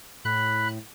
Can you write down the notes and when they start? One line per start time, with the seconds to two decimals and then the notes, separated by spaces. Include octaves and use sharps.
0.25 A2 B5 F#6